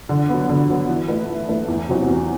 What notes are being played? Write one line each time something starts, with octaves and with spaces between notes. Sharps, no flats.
D3
F#3 B3
D3
F#3 B3
E3
A3 E4 B4
E3
A3 E4 B4
E2
C3 F#3 C4 F#4
E2